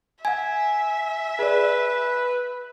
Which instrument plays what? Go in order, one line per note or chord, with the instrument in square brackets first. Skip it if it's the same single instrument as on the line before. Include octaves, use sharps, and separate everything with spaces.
[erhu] E5 [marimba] F#5 G#6 [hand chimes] G#5
[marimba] G#4 D5 [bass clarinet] B4